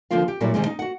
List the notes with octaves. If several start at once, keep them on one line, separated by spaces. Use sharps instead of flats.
D#2 D3 F3 A#3 F4 F5
G4
A#2 F#3 G3 A#3 E4
C3 D#3 G3 G#3
D#4
F#4 F#5